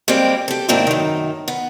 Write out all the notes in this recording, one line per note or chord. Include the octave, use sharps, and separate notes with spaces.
G3 G#3 A#3 C4 G4
G4 A4
G#2 D#3 A#3 C4 D4 E4
F#2 D#3
B3